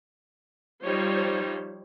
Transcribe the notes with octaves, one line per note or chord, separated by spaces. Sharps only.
F3 G3 D#4 C5 C#5